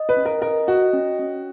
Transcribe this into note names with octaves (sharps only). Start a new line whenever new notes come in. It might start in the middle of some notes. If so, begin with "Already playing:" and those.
Already playing: D#5
B4
C#4
A#4
A#4 D#5
F#4 D#5
C#4
C#4